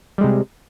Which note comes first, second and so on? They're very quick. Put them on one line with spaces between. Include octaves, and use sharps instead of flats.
G3 G#3 C3